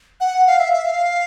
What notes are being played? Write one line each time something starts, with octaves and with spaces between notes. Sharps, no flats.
F#5
F5
E5
E5
F5